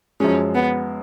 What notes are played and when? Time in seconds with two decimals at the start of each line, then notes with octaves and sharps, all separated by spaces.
0.20 F#2 F3 G#3 C#4
0.55 B3